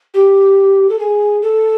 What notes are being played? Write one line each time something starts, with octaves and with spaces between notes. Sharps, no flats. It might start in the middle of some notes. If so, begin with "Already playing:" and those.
G4
A4
G#4
A4